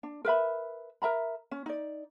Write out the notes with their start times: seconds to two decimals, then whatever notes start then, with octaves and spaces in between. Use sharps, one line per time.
0.03 D4
0.25 A#4 B4 E5 B5
1.02 A#4 E5 A#5 B5
1.51 C#4
1.66 D#4 D5